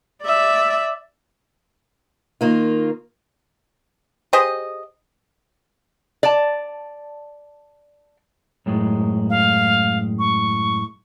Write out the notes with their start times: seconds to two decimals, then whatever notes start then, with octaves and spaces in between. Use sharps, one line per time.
0.23 D5 E5
2.41 D#3 A#3 F4
4.33 G4 G#4 C5 D#5
6.23 D5 A5
8.66 F#2 A2 G#3
9.30 F5
10.19 C#6